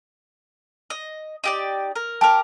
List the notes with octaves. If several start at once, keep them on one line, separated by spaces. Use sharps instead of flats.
D#5
D#4 G4 D5
A#4
G4 A#4 A5